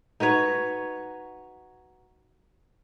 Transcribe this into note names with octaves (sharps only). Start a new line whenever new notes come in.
D#4 F#4 B4 C#5